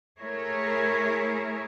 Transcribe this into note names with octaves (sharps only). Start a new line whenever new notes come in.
A3 E4 G#4 A#4 C#5